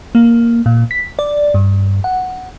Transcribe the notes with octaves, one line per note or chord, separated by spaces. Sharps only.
A#3
A#2
B6
D5
G2
F#5